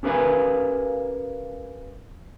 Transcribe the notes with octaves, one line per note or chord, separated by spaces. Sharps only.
C#4 G4 A#4 B4 F5 G#5